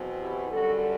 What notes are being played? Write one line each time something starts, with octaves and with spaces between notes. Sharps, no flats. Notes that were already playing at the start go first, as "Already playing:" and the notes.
Already playing: E2 B2 F#3 C4
E4 G4
F#2 D3 G3 F#4 A4